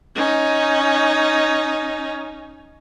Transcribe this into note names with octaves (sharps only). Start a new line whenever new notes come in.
C#4 D#4